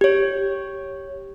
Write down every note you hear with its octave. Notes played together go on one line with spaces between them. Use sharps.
G4 C#5